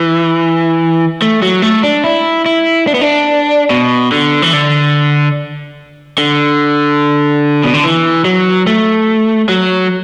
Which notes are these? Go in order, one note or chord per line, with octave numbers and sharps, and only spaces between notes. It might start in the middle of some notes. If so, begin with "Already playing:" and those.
Already playing: E3
A3
F#3
A3
D4
E4
E4
D4
B3
D4
B2
D3
E3
D3
D3
B2
D3
E3
F#3
A3
F#3